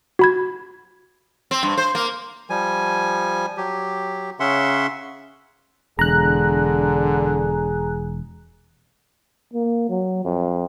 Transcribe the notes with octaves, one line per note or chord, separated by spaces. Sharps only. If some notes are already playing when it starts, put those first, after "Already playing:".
F#4 B5 G#6
C4
G2
C5
A#3
F3 G3 G#5
F#3 G4
C#3 C#4 E5 F#5 C6
E1 D3 G#4 A#5 F#6
A#3
F#3
F2